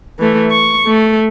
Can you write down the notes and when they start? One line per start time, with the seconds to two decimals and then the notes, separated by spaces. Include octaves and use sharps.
0.19 E3 A3
0.51 C#6
0.87 A3